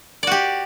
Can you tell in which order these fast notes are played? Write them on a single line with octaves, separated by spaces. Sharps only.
D5 F#4 G4